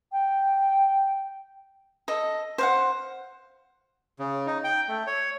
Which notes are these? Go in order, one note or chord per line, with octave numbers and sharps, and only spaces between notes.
G5
A4 D#5
C5 F5 F#5
C#3
D#4
G5
A3
C#5